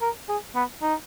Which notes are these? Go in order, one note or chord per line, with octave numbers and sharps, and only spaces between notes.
A#4
G#4
B3
D#4